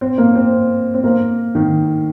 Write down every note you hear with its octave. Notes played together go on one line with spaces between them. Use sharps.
C4
A#3
C4
C4
A#3
D#3